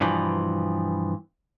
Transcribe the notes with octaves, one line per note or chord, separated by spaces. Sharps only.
G2 B2 E3 F3